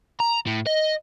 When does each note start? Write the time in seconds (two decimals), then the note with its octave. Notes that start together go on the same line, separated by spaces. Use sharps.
0.20 A#5
0.47 A2
0.67 D#5